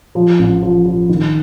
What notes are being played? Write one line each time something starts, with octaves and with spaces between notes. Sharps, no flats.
F3
A1
F3
F3
D#3